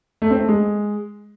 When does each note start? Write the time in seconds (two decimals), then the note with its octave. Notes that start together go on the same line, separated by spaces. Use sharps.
0.22 A3
0.31 C4
0.40 A3
0.49 G#3